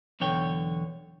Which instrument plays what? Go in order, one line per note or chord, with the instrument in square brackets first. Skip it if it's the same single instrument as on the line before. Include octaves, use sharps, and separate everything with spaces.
[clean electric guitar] B1 E2 D3 C#5 G5